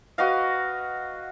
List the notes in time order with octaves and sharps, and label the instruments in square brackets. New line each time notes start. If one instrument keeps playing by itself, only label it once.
[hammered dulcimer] F#4 B4 D#5 F5